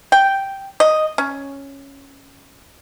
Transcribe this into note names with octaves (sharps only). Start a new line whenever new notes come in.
G5
D#5
C#4